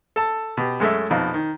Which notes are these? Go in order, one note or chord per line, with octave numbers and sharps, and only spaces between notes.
A4 A5
B2 G4
F#2 G#3 A3 A4 E5
A#1 F2 B2 D#4
D#3